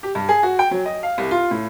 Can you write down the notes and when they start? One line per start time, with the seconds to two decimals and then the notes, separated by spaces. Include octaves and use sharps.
0.03 G4
0.15 G2
0.29 G#4
0.43 F#4
0.59 G5
0.71 F#3
0.86 D#5
1.03 F5
1.18 C2
1.31 F4
1.51 A2